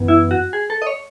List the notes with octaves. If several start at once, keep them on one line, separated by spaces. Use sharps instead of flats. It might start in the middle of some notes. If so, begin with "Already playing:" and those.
Already playing: F#2 E3 B3
E4
F#4
G#4
A4
D#5
C#5